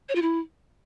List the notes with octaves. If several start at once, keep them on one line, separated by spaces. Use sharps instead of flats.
C#5
F4
E4